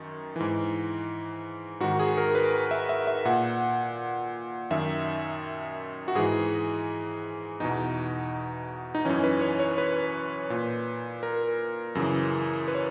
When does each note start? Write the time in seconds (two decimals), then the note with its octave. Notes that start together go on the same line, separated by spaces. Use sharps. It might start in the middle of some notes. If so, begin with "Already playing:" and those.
Already playing: F#2 D#3
0.36 G#2 E3
1.80 G#2 D#3 F#4
1.99 G#4
2.18 A#4
2.35 B4
2.71 E5
2.89 E5
3.07 E5
3.25 A#2 F#5
4.71 F#2 D#3 E5
6.08 F#4
6.15 G#2 E3 G#4
7.60 E2 B2 D#4
8.95 D#4
9.05 F#2 E3 C#4
9.24 B4
9.41 C#5
9.59 C#5
9.78 B4
10.50 A#2
11.23 A#4
11.95 F#2 C#3 E3
12.68 B4
12.75 C#5